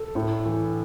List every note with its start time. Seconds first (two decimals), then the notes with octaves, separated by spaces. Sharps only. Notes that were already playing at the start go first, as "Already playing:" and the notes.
Already playing: A4
0.15 A2
0.46 E3